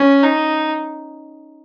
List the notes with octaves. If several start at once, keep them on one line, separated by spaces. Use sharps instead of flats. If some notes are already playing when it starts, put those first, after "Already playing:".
Already playing: C#4
D#4